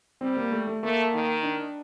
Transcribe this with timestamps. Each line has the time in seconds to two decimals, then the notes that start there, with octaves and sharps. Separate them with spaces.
0.21 G3 C4
0.37 A#3
0.52 A3
0.67 A3
0.83 A3 A#3
1.13 D#3
1.43 D4